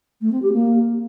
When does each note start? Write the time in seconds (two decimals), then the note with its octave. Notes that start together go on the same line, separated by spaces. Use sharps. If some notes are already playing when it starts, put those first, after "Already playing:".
0.21 A3
0.31 C4
0.42 G4
0.52 A#3